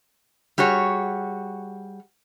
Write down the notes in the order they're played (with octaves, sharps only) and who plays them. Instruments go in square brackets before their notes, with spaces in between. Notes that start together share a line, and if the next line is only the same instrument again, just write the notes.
[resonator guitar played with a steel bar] G3 F#4 G#4 C#5